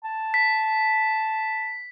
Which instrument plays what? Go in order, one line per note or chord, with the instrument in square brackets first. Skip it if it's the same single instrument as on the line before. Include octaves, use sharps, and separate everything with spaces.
[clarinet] A5
[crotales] B6